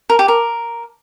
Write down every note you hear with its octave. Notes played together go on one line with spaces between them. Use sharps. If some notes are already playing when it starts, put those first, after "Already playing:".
A#4
G4
A#4